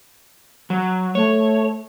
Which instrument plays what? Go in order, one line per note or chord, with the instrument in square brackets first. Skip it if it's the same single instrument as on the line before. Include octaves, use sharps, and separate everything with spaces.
[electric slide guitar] F#3
[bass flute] A3 [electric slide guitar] C#5